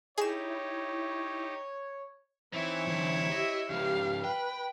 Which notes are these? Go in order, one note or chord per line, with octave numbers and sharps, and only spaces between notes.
D#4 E4 G4 G#4 C#5 E7
E3 C4 D#4 E4 C#5
D3 E3
G4 D#5 E5
C#3 F3 G4 F5
B4 G5